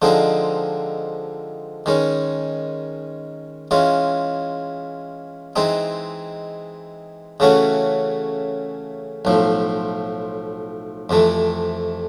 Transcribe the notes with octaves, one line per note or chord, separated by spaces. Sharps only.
D3 F3 G#3 C4 D#4
D#3 G#3 C#4
E3 G#3 C#4 F4
E3 G#3 C4 D#4
C#3 E3 A3 C#4 F#4
B1 A2 F3
F2 C3 E3 A3